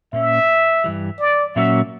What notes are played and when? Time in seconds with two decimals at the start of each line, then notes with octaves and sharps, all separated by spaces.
0.13 A#2 A#3 C#4 E5
0.84 G2 E3 G3
1.20 D5
1.56 A#2 F#3 A#3 C#4 F#4 E5